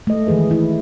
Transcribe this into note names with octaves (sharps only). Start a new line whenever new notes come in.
A3 D#5
D#3 E3 G#3 G#4 B4
E4